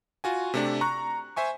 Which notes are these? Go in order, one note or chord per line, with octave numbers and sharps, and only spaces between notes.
F4 F#4 G#5
C3 A3 D4
A#5 C#6 F#6
C5 E5 G#5 C#6